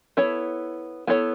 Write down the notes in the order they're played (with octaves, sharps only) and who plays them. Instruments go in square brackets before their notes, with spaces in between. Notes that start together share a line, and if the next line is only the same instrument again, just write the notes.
[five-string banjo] B3 E4 A4 C#5
B3 E4 A4 C#5